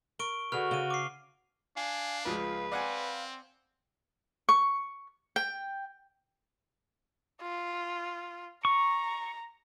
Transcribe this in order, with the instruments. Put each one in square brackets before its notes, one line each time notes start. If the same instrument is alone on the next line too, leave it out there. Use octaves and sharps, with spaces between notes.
[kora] A#4 [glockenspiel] C#6 D7 G7
[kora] D3 G#4 B4 [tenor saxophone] F#4 [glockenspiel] F6 F7
[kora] C#3 [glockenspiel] D#7 G7
[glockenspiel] D6 C7
[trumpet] D4 [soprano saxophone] F5 [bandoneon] G#5
[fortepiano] C#2 F3 G#3 [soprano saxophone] B4 [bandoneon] F5
[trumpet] C4 [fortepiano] D5 F#5 G#5 [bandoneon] F5
[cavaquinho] C#6
G5
[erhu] F4
[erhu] A#5 [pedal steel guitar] C#6